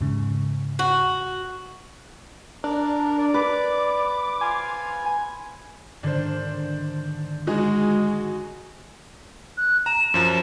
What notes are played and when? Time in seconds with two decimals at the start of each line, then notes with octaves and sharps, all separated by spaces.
0.01 E2 G#2 C#3
0.79 F#4
2.64 D4 A#4
3.18 D5
3.34 B4 D6
4.41 F4 G#5
6.03 G#2 D3 D#3 D4 C5
7.47 G#3 D#4 F#4 G#4
9.58 F#6
9.86 A#5 E7
10.14 F#2 F3